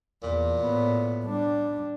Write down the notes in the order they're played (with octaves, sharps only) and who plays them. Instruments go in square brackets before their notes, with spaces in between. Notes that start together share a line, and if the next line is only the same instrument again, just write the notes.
[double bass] E2 [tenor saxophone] A#2
[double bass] A2 B3
G3 D4